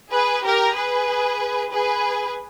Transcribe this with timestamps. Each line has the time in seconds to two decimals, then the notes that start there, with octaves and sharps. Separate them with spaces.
0.12 G#4 B4
0.44 G4 A#4
0.76 G#4 B4
1.72 G#4 B4